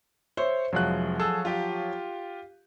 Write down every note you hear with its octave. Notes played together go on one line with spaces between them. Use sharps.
C5 C#5 E5
F1 F3 F#3 G#3 F#6
G#4 A4 E6
F4 G4